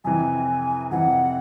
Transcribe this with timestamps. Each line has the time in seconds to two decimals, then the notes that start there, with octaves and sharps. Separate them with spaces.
0.04 F2 C3 E3 G#5
0.91 F2 C3 E3 F#5